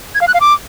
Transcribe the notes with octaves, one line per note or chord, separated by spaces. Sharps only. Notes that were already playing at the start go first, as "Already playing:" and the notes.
G#6
F5
F#6
F5
D6